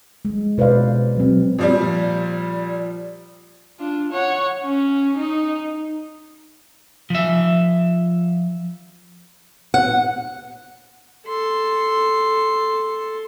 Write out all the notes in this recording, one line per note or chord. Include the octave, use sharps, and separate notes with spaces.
G#3
B2 B4 C5 D5 F5
F#3 C4
A#2 F3 G3
D4 F4
C#5 F#5
C#4
D#4
F3 E5
F#5
A4 C6